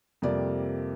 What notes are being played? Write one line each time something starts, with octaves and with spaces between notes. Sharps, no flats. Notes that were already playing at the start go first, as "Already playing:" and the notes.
F2 C3 G3 A#3 D5